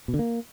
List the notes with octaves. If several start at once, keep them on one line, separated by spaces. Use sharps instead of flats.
B2
D3
A#3